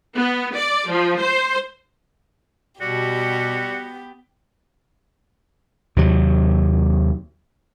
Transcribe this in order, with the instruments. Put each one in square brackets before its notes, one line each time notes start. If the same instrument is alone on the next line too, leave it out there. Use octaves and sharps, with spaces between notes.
[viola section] B3
D5
F3
C5
[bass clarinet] B2 [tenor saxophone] G3 [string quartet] B3 G4 [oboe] F#4
[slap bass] D#2 C3 F#3